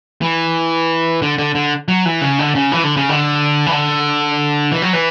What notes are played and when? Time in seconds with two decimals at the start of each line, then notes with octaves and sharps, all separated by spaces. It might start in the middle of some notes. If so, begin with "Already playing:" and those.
0.22 E3
1.22 D3
1.38 D3
1.55 D3
1.88 F#3
2.05 E3
2.21 C#3
2.39 D3
2.55 C#3
2.72 E3
2.84 D3
2.96 C#3
3.09 D3
3.66 E3
3.72 D3
4.72 E3
4.82 F#3
4.93 E3